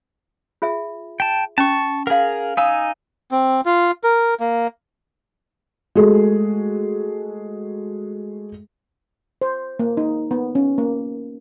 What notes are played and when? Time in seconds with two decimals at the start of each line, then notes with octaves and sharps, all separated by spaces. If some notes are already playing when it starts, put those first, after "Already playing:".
0.62 F4 G#4 E5
1.20 G5 A5
1.58 C#4 A5 C#6
2.07 G#4 A#4 F5 F#5
2.57 D#4 F5 G#5 D#6 E6
3.31 C4
3.66 F4
4.04 A#4
4.40 A#3
5.95 G#3 A3 F#4 G#4 A4
9.42 C5
9.79 A#3
9.97 D#4
10.31 B3
10.55 C#4
10.78 A#3